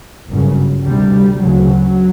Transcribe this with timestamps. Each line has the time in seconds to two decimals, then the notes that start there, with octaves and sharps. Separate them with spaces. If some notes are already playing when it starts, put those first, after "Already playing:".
0.29 G1 F#2 C#3
0.86 D2 C3 G3
1.43 D2 C#3 F#3